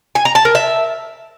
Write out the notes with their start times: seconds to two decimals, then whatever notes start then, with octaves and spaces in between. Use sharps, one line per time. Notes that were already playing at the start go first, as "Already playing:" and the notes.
0.15 G#5
0.25 A#5
0.35 A5
0.45 A#4
0.55 E5